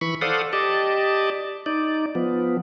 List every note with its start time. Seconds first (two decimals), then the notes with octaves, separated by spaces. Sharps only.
0.01 E3 B5 C#6
0.21 A4 C5 D5 F5 F#5 D#6
0.53 G4 D5 D#5 A5
1.66 D#4 D5
2.15 F3 B3